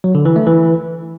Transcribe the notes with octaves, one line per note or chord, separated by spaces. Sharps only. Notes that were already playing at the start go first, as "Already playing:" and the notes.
F#3
D3
E3
A3
E3